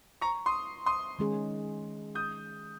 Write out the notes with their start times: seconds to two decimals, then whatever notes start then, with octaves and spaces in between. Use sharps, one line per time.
0.21 A#5 C#6
0.46 C6 D#6
0.86 C6 D#6
1.19 D#3 G#3 C#4 G#4
2.15 D#6 G6